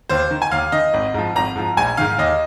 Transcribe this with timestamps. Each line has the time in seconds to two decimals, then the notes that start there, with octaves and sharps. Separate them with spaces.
0.09 D#2 C5
0.31 D#3
0.42 G#5
0.51 D#2 F5
0.72 D#3 D#5
0.94 G#1
1.14 G#2 F3
1.36 G#1 A#5
1.56 G#2 F3
1.77 A#1 G#5
1.97 G#2 D#3 F5
2.18 D#2 D#5